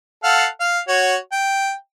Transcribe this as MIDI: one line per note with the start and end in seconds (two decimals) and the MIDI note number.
0.24 0.46 69
0.24 0.46 77
0.24 0.46 78
0.60 0.79 77
0.88 1.15 66
0.88 1.15 73
1.32 1.72 79